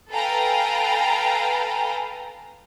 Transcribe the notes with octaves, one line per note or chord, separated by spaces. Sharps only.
A4 B4 F5 G5 G#5 A#5